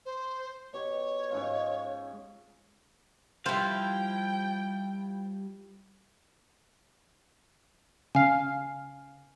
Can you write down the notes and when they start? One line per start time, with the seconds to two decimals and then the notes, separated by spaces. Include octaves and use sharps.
0.06 C5
0.73 B2 G4 C#5
1.30 G#2 C#4 F4
3.46 F3 G3 E4 C5 F5 G5
8.15 C#3 F5 G#5